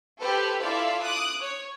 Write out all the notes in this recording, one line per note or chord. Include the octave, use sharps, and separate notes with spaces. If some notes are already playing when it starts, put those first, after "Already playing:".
G4 A4 B4 C5
E4 F4 A4 D5 E5 F5
D6 D#6 F#6
C#5